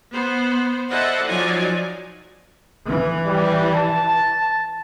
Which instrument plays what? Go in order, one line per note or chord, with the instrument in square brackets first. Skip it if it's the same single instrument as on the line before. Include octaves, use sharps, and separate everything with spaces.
[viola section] B3 C5
E4 A4 C5 D5 D#5 F#5
F3 F#3 D#4 C#5 D5 G#5
[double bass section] E3
[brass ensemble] G3
A5